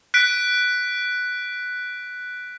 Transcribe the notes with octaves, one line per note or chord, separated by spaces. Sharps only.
F#6 B6 D7